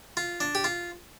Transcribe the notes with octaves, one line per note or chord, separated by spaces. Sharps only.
F4
D4
G4
F4